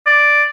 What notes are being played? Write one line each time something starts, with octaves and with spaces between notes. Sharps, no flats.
D5